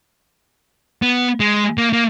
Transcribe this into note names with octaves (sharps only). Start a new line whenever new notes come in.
B3
G#3
A#3
A#3